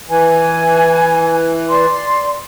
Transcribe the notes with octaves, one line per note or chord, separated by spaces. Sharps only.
E3 G#5
D5 C6